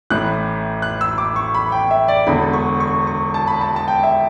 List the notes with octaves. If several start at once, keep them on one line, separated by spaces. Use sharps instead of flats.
A1 A2 E3 F#6
F#6
E6
D6
C#6
B5
G5
E5
D5
E1 E2 D3 B5
C#6
C#6
C#6
A5
B5
A5
A5
G5
E5